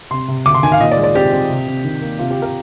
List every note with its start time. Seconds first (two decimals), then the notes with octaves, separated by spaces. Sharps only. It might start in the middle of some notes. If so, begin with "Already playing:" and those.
0.11 C3 C6
0.28 C3
0.45 D2 D6
0.54 C6
0.63 D#3 G#5
0.72 F5
0.80 A#2 D#5
0.91 D5
0.97 G#3
1.04 D5
1.15 C4 G4
1.32 C4
1.50 C3
1.67 C3
1.84 D#3
2.02 A#3
2.19 C3 F4
2.31 G4
2.36 C3
2.42 A#4